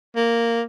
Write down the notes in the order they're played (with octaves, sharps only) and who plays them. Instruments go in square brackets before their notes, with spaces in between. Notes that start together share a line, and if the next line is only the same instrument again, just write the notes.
[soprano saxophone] A#3